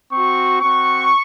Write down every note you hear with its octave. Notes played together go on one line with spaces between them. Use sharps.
C4 F#4 C#6
C4 F#4 C#6